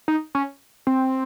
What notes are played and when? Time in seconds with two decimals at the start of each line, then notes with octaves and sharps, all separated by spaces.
0.08 D#4
0.35 C#4
0.87 C4